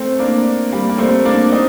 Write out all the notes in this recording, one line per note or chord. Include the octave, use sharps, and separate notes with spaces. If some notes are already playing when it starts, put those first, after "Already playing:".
Already playing: A3 C4
A#3 D4
G3 A#3
A#3
A3 C4
A#3 D4
C4 D#4